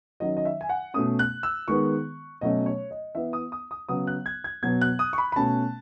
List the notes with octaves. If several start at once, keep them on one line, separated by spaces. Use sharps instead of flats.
D#3 F#3 C#4 D#5
D#5
E5
G#5
F#5
B2 A3 C#4 D#6
F#6
E6
D#3 G#3 B3 C#6
B2 F#3 A3 C#4 D#5
C#5
D#5
E3 B3 E5
D#6
D#6
D#6
C#3 F#3 B3 D#6
F#6
G#6
G#6
B2 F#3 B3 G#6
F#6
D#6
C#6
B5
B5
B2 A3 C#4 A5